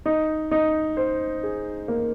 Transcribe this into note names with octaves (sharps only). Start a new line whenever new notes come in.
D#4
D#4
C5
G#4
A#3